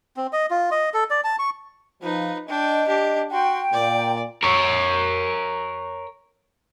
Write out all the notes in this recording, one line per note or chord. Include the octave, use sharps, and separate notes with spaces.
C4
D#5
F4
D#5
A4
D5
A5
C#6
F3 D#4 B4
D4 D#5 G5
D4 G4
F#4 G5 C6
A#2 D5
A#4 C#5